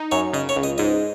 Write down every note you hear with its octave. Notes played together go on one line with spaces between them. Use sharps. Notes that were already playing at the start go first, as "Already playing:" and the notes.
Already playing: D#4
F#2 C#5
C#3 D#5
C#5
C#2
D#5
G#2 D#5